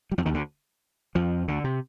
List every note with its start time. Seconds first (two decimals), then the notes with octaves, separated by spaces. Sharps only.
0.12 G3
0.18 F2 F3
0.26 D#2 D#3
0.34 D2 D3
1.15 F2 F3
1.48 D2 D3
1.64 C3